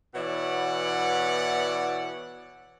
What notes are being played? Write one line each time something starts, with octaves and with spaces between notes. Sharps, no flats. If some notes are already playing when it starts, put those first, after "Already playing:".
B2 E3 E4 C#5 D5 F#5